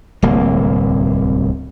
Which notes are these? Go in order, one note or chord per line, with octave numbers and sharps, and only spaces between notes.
D1 C2 A#3